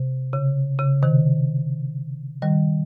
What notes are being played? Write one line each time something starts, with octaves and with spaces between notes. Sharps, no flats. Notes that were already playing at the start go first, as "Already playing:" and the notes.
Already playing: C3
C#3
C#3
C3 D#3
D#3 G3